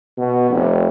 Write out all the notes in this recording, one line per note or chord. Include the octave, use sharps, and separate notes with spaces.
B2
F1